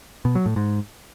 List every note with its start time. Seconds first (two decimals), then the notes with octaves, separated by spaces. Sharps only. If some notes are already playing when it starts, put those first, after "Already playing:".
0.25 B2
0.35 F#3
0.46 A2
0.56 G#2